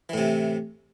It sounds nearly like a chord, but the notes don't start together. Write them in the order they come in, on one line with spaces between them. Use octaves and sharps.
E3 A2 C3